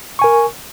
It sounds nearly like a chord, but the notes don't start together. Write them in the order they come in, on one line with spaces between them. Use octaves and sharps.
C#6 G#5 A#4